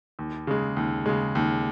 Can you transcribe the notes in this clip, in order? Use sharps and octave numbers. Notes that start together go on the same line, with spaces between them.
D#2
C#3 G#3
D#2
C#3 G#3
D#2